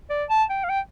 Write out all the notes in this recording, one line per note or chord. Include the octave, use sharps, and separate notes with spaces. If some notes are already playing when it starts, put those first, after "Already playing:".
D5
A5
G5
F5
G5